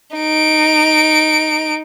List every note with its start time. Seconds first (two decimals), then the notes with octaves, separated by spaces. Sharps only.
0.17 D#4 D7